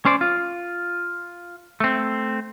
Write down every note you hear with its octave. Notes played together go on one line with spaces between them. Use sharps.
C#4 C5 D5
F4
A3 C4